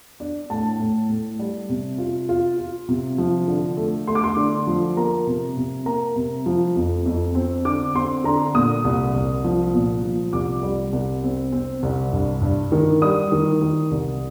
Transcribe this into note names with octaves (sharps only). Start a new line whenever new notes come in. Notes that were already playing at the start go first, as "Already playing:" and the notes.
D4
A2 A5
A2
A2
G3
C3
F4
F4
F4
C3
F3
D3
A3
A3 C6
D6
C6
D3
F3
A#3 A#5
C3
C3
A#3 A#5
C3
F3
F2
F2
C4
D3 D6
C4 C6
D3 A#5
A#2 D#6
C2
C2
F3
A#2
F3
C2 D6
G3
C2
C4
C4
C2
G2
G2
D#3
G3 D#6
D#3
D#3
C2